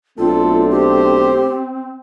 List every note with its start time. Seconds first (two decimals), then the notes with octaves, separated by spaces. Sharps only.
0.18 B1 A3 C4 D4 F4 A4
0.71 G4 C5